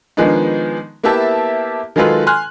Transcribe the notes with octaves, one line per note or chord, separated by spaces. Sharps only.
D#3 F3 G#3 B3 D4 D#4
A#3 B3 E4 G4 E5 A5
D#3 F#3 G#3 F4 A4 B4
G#5 C6 F6 F#6